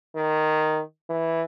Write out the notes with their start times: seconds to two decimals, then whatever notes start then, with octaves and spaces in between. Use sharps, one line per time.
0.15 D#3
1.10 E3